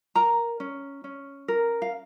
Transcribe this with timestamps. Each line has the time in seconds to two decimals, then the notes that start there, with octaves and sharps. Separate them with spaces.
0.15 A#4 A#5
0.60 C#4
1.04 C#4
1.48 A#4
1.82 F5